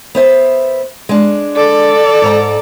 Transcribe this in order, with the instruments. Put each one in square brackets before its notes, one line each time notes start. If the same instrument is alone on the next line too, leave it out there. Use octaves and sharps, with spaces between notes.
[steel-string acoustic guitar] B3 C5 E5
G#3 D4
[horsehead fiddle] A4 D5
[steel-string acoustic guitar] G#2 A#5